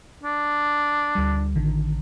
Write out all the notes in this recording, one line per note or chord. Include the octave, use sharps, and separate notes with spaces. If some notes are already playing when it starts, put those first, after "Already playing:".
D4
D2 G3
A1 D3 D#3